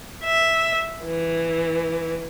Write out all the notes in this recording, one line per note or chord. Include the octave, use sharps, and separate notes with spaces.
E5
E3